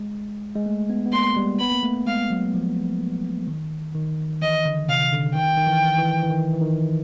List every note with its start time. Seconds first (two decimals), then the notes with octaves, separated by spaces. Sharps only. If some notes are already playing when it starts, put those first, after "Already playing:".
Already playing: G#3
0.55 G#3
0.66 A3
0.90 B3
1.06 B3
1.12 A#3 C6
1.37 G3
1.59 B3 B5
1.72 A#3
1.83 A3
2.07 G#3 F5
2.30 F#3
2.54 F3
3.47 D#3
3.95 D#3
4.42 E3 D#5
4.65 D3
4.88 C3 F5
5.12 D3
5.35 D#3 G5
5.57 D#3
5.67 E3
5.98 E3
6.23 E3
6.30 D#3
6.53 E3
6.61 D#3